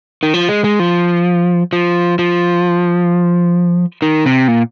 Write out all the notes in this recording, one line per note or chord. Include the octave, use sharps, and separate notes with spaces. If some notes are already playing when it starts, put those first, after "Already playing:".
D#3
F3
G#3
G#3
F3
F3
F3
D#3
C3
A#2